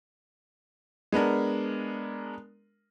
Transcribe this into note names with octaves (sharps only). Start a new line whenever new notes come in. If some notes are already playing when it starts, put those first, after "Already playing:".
G#3 B3 D4 A#4